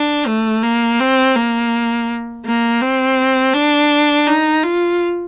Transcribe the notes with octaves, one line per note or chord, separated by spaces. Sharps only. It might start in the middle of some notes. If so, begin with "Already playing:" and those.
Already playing: D4
A3
A#3
C4
A#3
A#3
C4
D4
D#4
F4